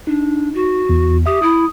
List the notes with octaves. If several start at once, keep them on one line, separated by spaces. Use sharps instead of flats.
D4 D#4
F#4
E2
G4 E5 D#6
E4 D#6